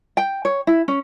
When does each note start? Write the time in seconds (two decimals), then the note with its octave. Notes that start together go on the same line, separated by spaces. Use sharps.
0.17 G5
0.45 C#5
0.67 E4
0.88 C#4